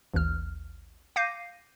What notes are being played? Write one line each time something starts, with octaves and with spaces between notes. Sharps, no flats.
A1 D#2 F6
F5 D6 G6 A#6 C7 D#7